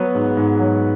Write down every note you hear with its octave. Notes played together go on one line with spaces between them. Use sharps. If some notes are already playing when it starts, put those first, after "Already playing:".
Already playing: F#3 B3 B4
G#2
G#2
F#3